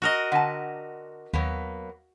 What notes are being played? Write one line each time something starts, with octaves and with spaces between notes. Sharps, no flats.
F#4 A#4 D#5
D3 F#5 G5 A5 A#5
D#2 F#3 A#3 B3